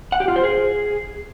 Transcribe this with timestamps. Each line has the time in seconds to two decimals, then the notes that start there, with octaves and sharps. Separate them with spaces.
0.12 F#5
0.20 G4
0.28 F4
0.36 C5
0.44 G#4